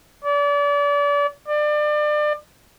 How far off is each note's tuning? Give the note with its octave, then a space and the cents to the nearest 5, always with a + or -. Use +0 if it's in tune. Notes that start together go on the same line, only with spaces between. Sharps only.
D5 -35
D5 +30